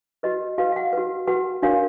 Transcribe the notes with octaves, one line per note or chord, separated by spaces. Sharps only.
F#4 B4 D#5
F#4 B4 F5
F5
F#5
F#4 B4
F#4 B4 F#5
D4 F#4 A#4 C#5 F5